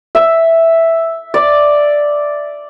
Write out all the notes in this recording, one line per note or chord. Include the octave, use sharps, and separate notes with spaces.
E5
D5